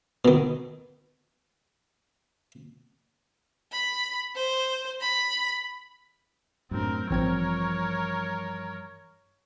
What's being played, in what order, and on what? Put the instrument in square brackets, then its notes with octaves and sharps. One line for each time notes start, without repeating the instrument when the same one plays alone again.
[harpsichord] B2 D#3
[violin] B5
C5
B5
[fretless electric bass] F#2 A2 D4 [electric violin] C4 A#4
[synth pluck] A1 C4 G#6 [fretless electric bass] G2 E3 F3 [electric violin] A#4 C#5